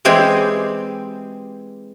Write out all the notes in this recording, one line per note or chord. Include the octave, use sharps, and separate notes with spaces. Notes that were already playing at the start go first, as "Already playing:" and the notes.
E3 G#3 C4 G4 G#4